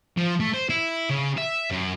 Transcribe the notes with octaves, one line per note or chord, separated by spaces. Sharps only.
F3
A3
C5
E4
C#3
E5
F#2